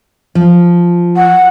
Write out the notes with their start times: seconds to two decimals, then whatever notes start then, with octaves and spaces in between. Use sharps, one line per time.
0.35 F3
1.17 F#5